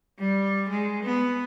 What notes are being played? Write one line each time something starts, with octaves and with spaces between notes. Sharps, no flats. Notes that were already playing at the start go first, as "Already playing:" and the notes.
G3
G#3
B3